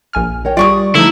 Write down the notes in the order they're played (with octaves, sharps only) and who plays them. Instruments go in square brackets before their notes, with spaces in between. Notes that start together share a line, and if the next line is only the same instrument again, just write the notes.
[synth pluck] A#1 G#5 F6
[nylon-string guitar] A#4 C#5 G5
[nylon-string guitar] G3 G#4 [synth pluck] F4 [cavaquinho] D5 C#6 D#6
[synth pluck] D3 F3 D#4 [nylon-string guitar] A3 [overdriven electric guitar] E4